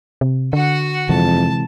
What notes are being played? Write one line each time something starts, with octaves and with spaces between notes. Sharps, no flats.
C3
D3 F#4 F#5
F2 C3 E3 G#3 A5